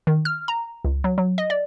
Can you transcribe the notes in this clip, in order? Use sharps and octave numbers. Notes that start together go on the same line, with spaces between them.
D#3
F6
A#5
C#2
F#3
F#3
D#5
D5